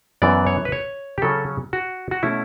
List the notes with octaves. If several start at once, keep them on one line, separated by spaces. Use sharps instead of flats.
F#2 E3 B3 D5
C#5
B4
C#5
G4
C#3 F#3 C#4 A4
F#4
F#4
B2 A3 C#4 E4